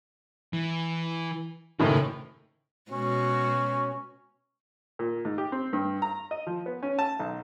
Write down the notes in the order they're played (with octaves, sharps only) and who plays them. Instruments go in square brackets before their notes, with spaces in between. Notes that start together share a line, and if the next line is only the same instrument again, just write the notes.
[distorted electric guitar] E3
[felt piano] F#1 A2 D#3 [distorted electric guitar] E3
[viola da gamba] B2 G#3 F#4 [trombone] C#4
[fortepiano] A#2
G#2
G4
C4
G2
A#5
D#5
F3
B3
C#4
A5
B1